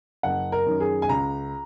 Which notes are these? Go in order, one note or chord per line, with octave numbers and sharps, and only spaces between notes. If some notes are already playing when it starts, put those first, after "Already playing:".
F#1 F#5
A#4
F#2 D#3
G#4
G#5
C#2 A#5